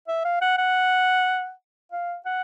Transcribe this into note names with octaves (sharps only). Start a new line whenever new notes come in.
E5
F5
F#5
F#5
F5
F#5